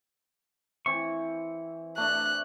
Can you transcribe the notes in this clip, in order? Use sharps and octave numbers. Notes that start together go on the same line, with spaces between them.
E3 C4 C#6
A3 D4 F#6